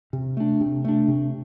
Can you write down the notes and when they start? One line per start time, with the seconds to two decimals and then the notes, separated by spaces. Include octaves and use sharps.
0.13 C3
0.37 A3 D4
0.61 C3
0.85 A3 D4
1.08 C3